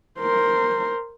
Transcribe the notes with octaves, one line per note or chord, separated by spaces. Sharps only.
A#4 C5